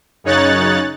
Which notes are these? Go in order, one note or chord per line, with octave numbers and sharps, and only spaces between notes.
F#2 C#3 D#4 C#5 F#6 A6